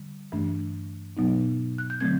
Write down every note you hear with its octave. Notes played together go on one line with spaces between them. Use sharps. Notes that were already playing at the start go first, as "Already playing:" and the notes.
Already playing: D3 G3
G2 E3 A3 D4
B2 F#3 B3 D#4
F#6
G6
D3 F#3 A3 C4 G#6